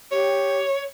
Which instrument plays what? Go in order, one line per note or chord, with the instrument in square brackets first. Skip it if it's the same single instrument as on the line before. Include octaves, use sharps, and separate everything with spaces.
[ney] G4 [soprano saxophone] C#5